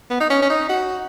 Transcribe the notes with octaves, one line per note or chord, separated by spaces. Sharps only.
B3
D#4
C#4
C#4
D#4
F#4